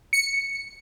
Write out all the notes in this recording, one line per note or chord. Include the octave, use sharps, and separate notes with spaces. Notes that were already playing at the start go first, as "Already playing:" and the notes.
C#7